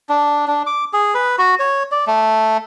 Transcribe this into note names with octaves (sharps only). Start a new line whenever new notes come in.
D4
D4
D6
G#4
B4
F#4
C#5
D5
A3